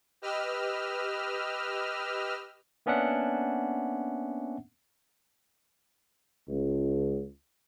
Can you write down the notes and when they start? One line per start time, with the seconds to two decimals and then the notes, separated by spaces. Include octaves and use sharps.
0.22 G4 B4 D#5 E6 F6
2.86 A#3 B3 C#4 D4 E5 F#5
6.48 C#2